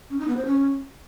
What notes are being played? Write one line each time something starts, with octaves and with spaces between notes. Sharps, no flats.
C#4
D#4
B3
C5
C#4